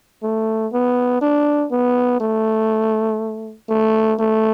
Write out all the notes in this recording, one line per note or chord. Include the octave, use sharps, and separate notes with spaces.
A3
B3
D4
B3
A3
A3
A3